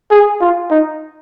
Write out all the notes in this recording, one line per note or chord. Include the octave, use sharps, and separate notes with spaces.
G#4
F4
D#4